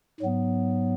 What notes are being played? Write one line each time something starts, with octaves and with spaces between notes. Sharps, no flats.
G#2 F#3 B3